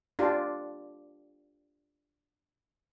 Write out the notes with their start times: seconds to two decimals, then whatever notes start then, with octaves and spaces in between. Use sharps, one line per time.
0.19 D4 F4 G4